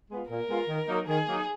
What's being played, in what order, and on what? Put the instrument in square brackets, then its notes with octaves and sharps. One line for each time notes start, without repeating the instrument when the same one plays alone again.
[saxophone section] G#3 B3 F4
[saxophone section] A#2 [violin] A#4
[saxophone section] G#3 B3 F4
D#3
F#3 A#3 D#4
[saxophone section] D#3 [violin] G#4
[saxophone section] F#3 A#3 D#4